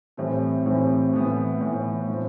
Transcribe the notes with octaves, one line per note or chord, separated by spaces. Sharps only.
A2 E3 G3 C4
A2 E3 G3 C4
A2 E3 B3
A2 E3 B3
A2 F3 C4